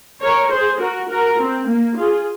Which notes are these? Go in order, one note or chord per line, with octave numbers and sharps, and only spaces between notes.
A#4 C#5
G#4 C5
F#4 A#4
F#4 A#4
C4
A#3
F4 G#4